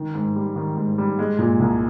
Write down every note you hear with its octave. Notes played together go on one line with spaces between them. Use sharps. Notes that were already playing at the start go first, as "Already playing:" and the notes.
Already playing: D#3
G#2
G3
D#3
G#2
G3
G#3
A#2
C2